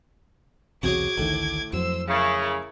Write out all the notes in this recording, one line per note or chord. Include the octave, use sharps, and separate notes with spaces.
B1 E2 C3 F#4 G#4 C#5 D6 G#6
A1 D2 A2 D#3
F2 F#3 C5 E6
C#3 E4 A#4